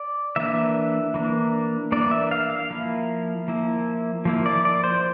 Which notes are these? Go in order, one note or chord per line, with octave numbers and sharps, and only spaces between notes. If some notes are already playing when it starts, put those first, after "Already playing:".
Already playing: D5
E3 A#3 D4 E5
E3 A#3 D4
E3 A#3 D4 D5
E5
F5
F5
F3 A#3 E4
F3 A#3 E4
F3 A#3 E4
D5
D5
C5